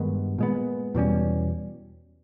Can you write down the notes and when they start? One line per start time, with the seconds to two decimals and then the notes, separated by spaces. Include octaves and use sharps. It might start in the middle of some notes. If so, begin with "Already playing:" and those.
Already playing: G2 D#3 G#3 B3
0.38 A#2 G#3 B3
0.95 E2 B2 G3 C#4